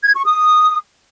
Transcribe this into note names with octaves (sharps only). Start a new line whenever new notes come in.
G#6
C#6
D#6